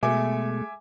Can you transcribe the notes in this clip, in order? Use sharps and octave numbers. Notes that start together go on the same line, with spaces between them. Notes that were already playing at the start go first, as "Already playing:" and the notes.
B2 G#3 A3 E5 G#5 D6